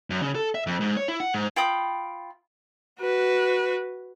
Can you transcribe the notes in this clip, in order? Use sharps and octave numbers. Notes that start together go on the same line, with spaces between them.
F#2
C#3
A4
E5
F2
G#2
C#5
E4
F#5
G#2
F4 G5 B5 D#6
F#4 B4